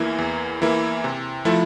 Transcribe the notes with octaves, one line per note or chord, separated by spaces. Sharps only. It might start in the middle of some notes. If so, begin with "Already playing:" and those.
Already playing: E2 E3 A#3 E4
E2
E3 A#3 E4
C3
F3 A3 E4 A4